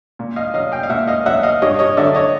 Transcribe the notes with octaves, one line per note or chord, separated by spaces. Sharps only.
A#2
D#5 F5
F#3 D#5 F5
F5 G5
F5
A#2 E5 F#5
D#5 F5
F#3 E5 F#5
D#5 F5
G2 C#5 D#5
C#5 D#5
D3 F#3 D5 E5
C#5 D#5